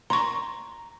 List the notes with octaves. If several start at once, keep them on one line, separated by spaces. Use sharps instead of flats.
A#5 C6 C#6